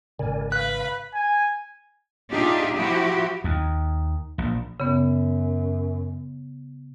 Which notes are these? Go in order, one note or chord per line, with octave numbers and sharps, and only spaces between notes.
G#1 C#3 A#4 D5 G#5
B4 F5 B5 F#6
G#5
D4 D#4 F4 G4 G#4 E5
F3 E4 F#4 G4
D#2
A#1
F#2 C#3 B3